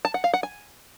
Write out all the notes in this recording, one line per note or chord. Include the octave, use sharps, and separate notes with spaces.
A5
F#5
F5
F#5
G#5